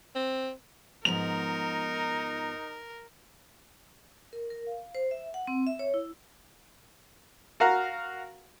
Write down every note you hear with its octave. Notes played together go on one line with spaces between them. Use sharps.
C4
G#2 F3 B3 D#4 A#4 F7
A#4
A#4
F5
C5
E5
F#5
C4
E5
C#5
E4
F#4 A#4 F5 F#5 A#5